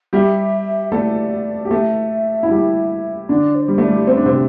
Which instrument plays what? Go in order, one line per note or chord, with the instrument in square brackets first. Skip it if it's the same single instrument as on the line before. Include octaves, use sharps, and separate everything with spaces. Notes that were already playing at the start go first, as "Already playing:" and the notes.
[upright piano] G3 G4 [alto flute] E5
[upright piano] A3 A4 [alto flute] D5
[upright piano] G4
[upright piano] A3 A4 [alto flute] E5
[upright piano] E4
G3 G4
[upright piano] D3 D4 [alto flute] D5
[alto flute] C5
[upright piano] G3
[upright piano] A3 [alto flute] D5
[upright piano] G3
[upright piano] C4 [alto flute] C5
[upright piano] D4
C3 C4